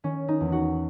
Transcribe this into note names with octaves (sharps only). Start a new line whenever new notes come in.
D#3 C#4
D#4
E2
F#4